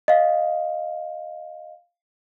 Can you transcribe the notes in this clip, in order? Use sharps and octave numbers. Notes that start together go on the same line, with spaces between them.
D#5 F5